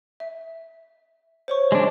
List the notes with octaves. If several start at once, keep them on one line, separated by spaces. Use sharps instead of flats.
E5
C5 C#5 C#6
G#3 D4